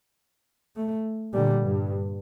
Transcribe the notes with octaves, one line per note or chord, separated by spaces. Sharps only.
A3
A#2 D3 G3
G2